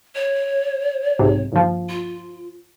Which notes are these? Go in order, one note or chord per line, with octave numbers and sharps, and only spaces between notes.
C#5
B1 G#2 C3
G1 D#2 F3
F4